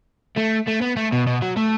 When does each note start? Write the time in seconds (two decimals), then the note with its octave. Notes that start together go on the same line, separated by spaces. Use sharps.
0.36 A3
0.67 A3
0.81 B3
0.97 A3
1.12 B2
1.27 B2
1.42 F#3
1.57 A3